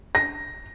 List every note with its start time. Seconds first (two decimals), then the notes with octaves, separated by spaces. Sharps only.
0.15 A#6